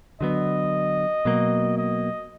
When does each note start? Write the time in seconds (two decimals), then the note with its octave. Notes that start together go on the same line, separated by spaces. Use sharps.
0.21 D3 F#3 B3 D#5
1.25 B2 F#3 A#3
1.78 D#5